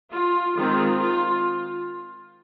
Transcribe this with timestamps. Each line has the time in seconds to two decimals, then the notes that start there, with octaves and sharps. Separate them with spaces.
0.12 F4
0.56 D#3 G#3 C4 F4
0.99 F4